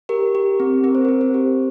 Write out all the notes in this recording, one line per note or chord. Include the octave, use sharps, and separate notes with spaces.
G4 A#4
G4
C4
C4 A#4
C5
C4 A#4
C5
G4